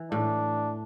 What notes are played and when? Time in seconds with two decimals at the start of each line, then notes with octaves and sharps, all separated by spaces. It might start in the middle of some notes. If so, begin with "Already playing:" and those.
Already playing: E3
0.12 A2 D4